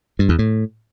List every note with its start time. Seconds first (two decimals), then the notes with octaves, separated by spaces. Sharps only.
0.19 G2
0.29 E2
0.39 A2